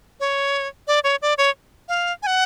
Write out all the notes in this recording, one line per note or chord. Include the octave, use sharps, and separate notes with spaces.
C#5
D5
C#5
D5
C#5
F5
G#5
F#5